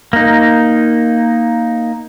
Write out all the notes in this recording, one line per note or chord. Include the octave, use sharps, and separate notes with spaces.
A#3 D#4